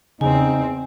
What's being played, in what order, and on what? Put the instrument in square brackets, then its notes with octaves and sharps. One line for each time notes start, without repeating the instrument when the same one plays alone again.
[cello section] E2 C4 [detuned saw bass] C#3 [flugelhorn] D#4 [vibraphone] G#5